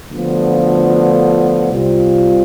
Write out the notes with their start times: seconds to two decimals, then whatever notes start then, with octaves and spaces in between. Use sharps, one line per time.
0.11 D2 D3 F3 B3 F4
1.71 C2 C3 G3 C4 F4